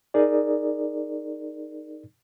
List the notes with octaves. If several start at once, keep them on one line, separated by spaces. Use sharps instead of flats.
D#4 G#4 A#4 D5